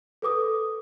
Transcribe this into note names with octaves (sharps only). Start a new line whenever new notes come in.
A4 B4 D6 D#6